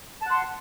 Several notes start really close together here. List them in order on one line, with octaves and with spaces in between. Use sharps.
A5 F#5 C6